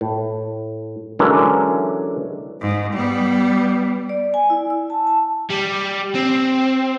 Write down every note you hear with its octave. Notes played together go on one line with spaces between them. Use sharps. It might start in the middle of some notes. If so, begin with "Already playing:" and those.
A2
D3 E3 F#3 G#3 C#4 A#4
G#2
G3 B3
D5
G#5
E4
E6
A5
A5
G3
C4